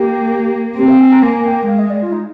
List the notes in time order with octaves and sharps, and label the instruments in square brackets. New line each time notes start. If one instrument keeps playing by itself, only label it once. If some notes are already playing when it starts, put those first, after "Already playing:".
Already playing: [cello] A#3 [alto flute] G4
[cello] C4 [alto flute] G4
[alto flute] F5
G#5
A#5
[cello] A#3 [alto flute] G#5
[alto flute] G5
[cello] G#3 [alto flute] F5
[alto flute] D#5
D5
F4
D#4